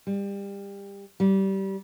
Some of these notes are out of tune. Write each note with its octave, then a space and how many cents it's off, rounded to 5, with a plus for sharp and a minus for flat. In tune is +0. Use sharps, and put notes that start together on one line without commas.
G3 +25
G3 -20